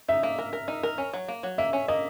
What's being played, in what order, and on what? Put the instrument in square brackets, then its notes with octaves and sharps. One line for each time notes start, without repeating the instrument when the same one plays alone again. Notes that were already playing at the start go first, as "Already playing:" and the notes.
[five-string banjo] D#4 [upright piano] E5
[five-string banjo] A#3
A#4
A#4
D#4
A#4
C#4
F#3
A#3
F#3
[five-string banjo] A#3 [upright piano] E5
[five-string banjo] C#4
[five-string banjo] A#3 [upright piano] D#5